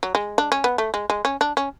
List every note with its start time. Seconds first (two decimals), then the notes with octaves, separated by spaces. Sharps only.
0.03 F#3
0.15 G#3
0.38 D4
0.52 C#4
0.64 B3
0.78 A3
0.94 G#3
1.10 G#3
1.25 C#4
1.41 D4
1.57 C#4